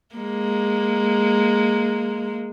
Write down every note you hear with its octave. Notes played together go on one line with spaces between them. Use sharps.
G#3 A#3